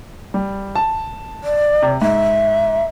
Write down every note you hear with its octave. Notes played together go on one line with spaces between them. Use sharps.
G3
A5
D5
C3
G#2 E5